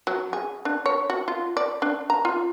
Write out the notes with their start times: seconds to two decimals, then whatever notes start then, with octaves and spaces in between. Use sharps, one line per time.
0.07 F#3
0.33 G#4
0.65 D4
0.86 C#5
1.10 F#4
1.28 F4
1.57 D5
1.82 D4
2.10 A#5
2.25 F4